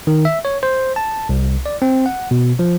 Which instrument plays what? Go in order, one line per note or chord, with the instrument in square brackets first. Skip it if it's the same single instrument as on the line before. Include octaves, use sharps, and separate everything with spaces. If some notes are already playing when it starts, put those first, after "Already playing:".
[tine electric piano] D#3
E5
C#5
C5
A5
C2
D5
C4
F#5
B2
F3